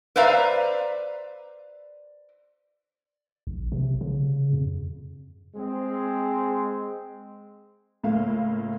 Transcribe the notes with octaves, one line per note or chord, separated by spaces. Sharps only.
B4 C5 D5 E5 F5 A#5
A#1
C3
C#3
F2
G#3 C4
C#2 A2 A#3 F5